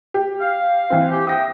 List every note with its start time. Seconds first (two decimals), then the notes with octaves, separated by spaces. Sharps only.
0.14 G4
0.40 F5
0.90 E3 C4
1.10 G4
1.27 E5 F#5 G5 D#6 A#6